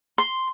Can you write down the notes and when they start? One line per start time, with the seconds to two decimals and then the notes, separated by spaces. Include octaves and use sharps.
0.18 C6